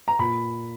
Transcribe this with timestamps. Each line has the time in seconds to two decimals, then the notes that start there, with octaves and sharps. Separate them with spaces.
0.08 A#5
0.19 A#2 B5